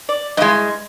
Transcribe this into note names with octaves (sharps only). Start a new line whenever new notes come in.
D5
G2 G#3 E4 D#5